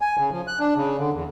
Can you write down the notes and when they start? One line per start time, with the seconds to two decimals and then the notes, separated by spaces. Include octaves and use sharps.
0.01 G#5
0.18 C#3
0.32 F3
0.48 F#6
0.59 D4
0.76 C#3
0.99 D3
1.13 E2